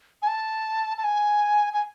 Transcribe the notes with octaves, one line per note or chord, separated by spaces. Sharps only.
G#5
A5
A5
G#5
G#5